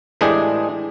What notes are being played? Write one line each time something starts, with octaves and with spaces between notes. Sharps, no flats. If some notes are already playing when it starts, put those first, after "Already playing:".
A2 E3 G#3 D4 G4 G#4